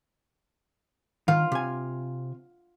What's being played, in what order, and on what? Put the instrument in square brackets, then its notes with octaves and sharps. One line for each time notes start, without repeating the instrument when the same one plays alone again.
[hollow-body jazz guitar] D#3 [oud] F4
[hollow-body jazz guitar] C3 G#5